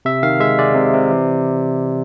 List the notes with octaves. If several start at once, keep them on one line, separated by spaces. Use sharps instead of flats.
C3 E5
D#3 F5
G#3 E5
G#3 D5
C3
C3
E3